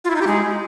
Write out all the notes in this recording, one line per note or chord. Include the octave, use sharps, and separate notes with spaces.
F4
E4
D#4
G4
G#3